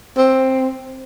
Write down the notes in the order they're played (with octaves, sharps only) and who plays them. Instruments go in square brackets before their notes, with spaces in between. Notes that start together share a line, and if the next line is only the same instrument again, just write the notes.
[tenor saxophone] C4